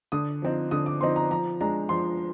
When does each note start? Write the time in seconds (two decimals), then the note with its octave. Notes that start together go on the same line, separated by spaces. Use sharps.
0.12 D3 D#6
0.42 F3 C4 D#4
0.71 D3 D#6
0.86 D6
1.01 F3 C4 D#4 C6
1.16 A#5
1.31 F3 A#5
1.61 G#3 D4 A#5
1.89 F3 C6